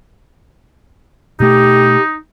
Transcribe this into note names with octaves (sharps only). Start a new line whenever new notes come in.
B2 A3 D#4 G4